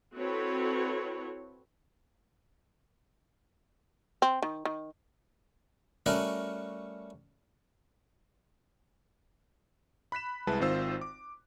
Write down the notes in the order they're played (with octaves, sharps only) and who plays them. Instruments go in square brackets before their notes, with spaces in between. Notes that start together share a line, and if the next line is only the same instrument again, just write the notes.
[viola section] C4 E4 F#4 A4 B4 C#5
[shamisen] C4
D#3
D#3
[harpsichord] G3 A3 C#4 F#4 A#4
[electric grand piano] B5 F#6 B6 E7
C2 G#3 E4 G#4 B4 A5
G#1 D#3 C4 F4 C5 E6
D6